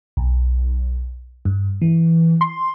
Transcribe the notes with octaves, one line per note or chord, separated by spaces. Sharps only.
B1
G2
E3
C6